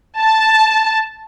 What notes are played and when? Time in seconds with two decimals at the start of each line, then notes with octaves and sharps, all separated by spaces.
0.19 A5